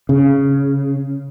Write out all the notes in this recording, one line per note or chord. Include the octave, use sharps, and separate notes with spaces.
C#3